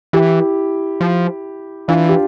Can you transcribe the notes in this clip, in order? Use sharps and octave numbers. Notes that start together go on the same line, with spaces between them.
E3 E4 G4
F3
E3 D4 F4
G4